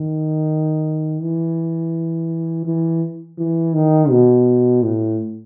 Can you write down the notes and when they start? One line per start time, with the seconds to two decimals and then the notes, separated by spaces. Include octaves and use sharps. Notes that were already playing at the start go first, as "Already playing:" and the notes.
Already playing: D#3
1.22 E3
2.66 E3
3.38 E3
3.74 D#3
4.10 B2
4.82 A2